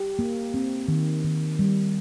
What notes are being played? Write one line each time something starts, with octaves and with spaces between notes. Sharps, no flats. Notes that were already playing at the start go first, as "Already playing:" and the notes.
Already playing: G4
A#3
C4
D#3
D#3
G3